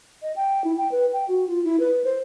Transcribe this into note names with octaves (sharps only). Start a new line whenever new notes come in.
D#5
G5
E4
G5
B4
G5
F#4
F4
E4
B4
C5